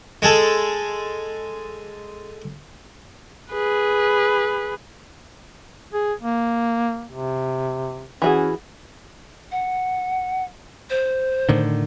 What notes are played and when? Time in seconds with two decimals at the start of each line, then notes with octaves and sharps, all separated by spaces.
0.22 G#3 G#4 A4
3.53 G#4 B4
5.93 G#4
6.22 A#3
7.11 C3
8.22 E3 C#4 F#4 G#4
9.51 F#5
10.90 C5
11.49 A2 D3 D#3